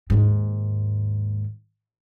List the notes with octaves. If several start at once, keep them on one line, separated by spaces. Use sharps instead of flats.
D#2 G#2